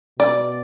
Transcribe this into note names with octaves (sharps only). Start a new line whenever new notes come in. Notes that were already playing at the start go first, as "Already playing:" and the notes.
B2 D5